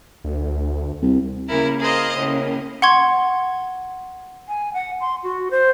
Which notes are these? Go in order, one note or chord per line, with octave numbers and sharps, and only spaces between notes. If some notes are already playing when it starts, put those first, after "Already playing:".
D2
C2
C#3 A#3 C#4 E4 A#4
G#4 A#4 C5 D#5 F5
A2 C#3 A#3
F#5 C6 C#6 G#6
G#5
F#5
C6
F#4
C5